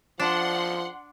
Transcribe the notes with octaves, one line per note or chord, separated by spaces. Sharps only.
F3 D4 F#5 C6